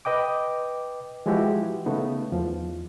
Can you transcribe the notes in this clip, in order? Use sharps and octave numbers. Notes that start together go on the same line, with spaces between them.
B4 D#5 G5 D6
E3 F3 G#3 E4 F#4 G4
C#3 A3 B3 D#4
E2 F3